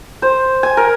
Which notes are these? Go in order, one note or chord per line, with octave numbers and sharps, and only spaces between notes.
C5
G#5
A#4